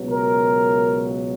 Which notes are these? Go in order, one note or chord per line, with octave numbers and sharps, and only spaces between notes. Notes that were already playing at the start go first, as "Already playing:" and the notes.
Already playing: C#2 B2 F#3
A#4